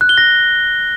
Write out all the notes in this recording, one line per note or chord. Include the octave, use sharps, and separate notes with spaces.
F#6
G7
A#6